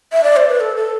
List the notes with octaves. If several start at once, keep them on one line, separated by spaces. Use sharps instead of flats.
E5
D5
C5
B4
A4
A4